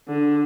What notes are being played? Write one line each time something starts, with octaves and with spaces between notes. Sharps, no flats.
D3